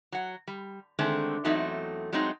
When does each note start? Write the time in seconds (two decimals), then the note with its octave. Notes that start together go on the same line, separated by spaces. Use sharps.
0.12 F#3 F#5
0.47 G3
0.99 D3 D#3 G#3 A3 C4
1.44 E2 F#3 A3 C4 D#4 E5
2.12 F#3 G#3 A3 C4 D#4